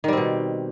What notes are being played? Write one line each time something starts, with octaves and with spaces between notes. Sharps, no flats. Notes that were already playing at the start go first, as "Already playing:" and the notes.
B2 D#3 G3 C4